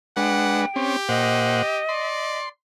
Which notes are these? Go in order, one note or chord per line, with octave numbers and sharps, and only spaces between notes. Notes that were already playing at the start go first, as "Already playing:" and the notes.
G#3 D4 B4 F#5 G5
C4 C#4 G4
A#2 C5 D#5 F#5
D5 C6